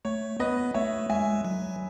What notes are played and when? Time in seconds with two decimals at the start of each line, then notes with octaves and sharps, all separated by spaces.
0.05 A3 C#5
0.40 B3 B4 D#5
0.74 A3 C#5 E5
1.10 G#3 E5 G#5
1.45 F#3